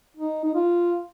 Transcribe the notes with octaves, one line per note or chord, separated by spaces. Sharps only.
D#4
D#4
F4